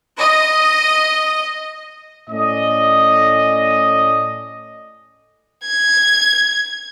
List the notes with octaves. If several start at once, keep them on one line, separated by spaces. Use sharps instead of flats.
D#5
A2 C#4 A4 D5 D#5
G#6